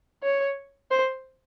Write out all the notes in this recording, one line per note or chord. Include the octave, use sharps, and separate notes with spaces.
C#5
C5